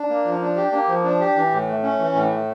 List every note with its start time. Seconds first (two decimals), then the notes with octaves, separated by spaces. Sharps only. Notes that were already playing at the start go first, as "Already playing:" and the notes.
Already playing: D4
0.09 A#3
0.25 F3
0.41 D4
0.56 G4
0.72 A#3
0.88 F3
1.04 D4
1.20 G4
1.36 E3
1.52 A2
1.67 A3
1.83 C#4
1.99 E3
2.15 A2
2.31 A3